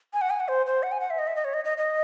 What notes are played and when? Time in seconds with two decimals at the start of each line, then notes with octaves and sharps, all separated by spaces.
0.14 G#5
0.21 F#5
0.30 G#5
0.40 F#5
0.48 C5
0.66 C5
0.83 F#5
0.92 G#5
1.00 F#5
1.10 E5
1.19 D#5
1.27 E5
1.36 D#5
1.45 C#5
1.54 D#5
1.65 D#5
1.78 D#5